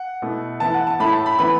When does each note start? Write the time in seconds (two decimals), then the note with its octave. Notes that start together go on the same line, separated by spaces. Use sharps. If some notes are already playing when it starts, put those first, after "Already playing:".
Already playing: F#5
0.22 B2 A3 E4
0.60 E3 B3 E4 A5
0.74 F#5
0.87 A5
1.00 A2 A3 E4 B5
1.13 A5
1.26 B5
1.38 E3 B3 E4 B5